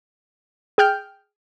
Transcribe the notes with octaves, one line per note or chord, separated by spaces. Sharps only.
G#4 G5 F6 G6